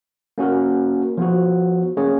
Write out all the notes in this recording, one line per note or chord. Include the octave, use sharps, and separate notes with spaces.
A#3 C#4 F#4 A#4
F3 B3 F#4
A#3 C#4 G#4 C#5